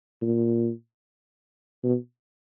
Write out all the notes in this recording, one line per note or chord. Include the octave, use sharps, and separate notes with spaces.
A#2
B2